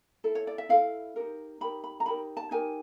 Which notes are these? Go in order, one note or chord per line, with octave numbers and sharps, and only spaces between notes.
E4 A4
C#5
D5
E5
E4 A4 F5
D#4 G4 A#4
D#4 G4 A#4 B5
B5
A#5
D#4 G4 A#4 B5
A5
D#4 G4 A#4 G#5